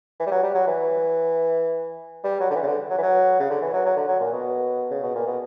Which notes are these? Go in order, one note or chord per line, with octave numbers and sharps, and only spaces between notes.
E3
G3
F#3
G3
F#3
E3
G3
F#3
D3
E3
C#3
D3
F#3
E3
F#3
C#3
D3
E3
F#3
F#3
D3
F#3
A#2
B2
C#3
B2
A#2
B2